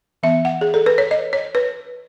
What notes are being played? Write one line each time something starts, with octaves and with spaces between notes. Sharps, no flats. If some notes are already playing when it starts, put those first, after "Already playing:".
E3 B3 E5
F#5
G#4
A4
B4
C#5
D#5
C#5
B4